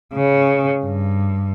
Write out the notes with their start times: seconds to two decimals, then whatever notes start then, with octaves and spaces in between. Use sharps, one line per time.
0.14 C#3
0.85 G2